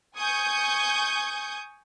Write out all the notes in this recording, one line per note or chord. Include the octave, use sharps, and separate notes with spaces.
G#5 C#6 D#6 G6 G#6